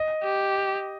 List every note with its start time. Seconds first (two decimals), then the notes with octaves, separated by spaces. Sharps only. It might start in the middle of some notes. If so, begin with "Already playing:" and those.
Already playing: D#5
0.23 G4